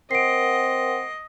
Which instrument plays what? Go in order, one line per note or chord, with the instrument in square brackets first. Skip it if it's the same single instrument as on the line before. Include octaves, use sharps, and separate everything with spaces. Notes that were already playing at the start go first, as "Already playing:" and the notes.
[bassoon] C4 [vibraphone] A#4 F#5 [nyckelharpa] D#5 [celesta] C7 D7